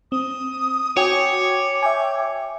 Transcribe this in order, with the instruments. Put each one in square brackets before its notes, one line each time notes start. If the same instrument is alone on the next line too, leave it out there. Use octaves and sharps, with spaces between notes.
[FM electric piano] C4 [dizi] D#6
[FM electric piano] F#4 G5 G#5 [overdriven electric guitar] C#5 [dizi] D6
[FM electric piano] E5 G5 G#5